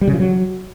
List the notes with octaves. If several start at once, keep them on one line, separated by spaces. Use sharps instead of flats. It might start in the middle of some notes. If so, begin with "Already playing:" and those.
G3
C#3
F3
F#3